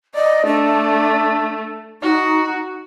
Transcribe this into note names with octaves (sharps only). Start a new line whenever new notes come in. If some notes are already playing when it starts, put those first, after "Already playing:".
D5 D#5
A3 D4
D#4 F#4